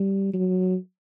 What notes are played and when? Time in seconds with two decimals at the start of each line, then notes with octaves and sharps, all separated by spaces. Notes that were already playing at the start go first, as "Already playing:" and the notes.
Already playing: G3
0.33 F#3